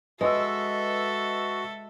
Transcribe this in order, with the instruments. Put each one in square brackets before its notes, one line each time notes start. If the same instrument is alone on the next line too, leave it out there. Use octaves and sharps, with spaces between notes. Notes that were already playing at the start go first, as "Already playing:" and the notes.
[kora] G#3 [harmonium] F#4 [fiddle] A4 E5 [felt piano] B4 D#5 E6